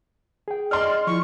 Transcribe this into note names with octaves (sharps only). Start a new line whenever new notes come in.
G#4 G5
D5 D#5 C6 F6
F3 E4 C#6